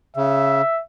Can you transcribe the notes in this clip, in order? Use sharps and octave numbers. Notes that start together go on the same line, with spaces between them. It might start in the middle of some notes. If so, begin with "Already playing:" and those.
C#3 E5